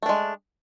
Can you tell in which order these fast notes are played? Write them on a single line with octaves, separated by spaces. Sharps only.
A3 D4 G#3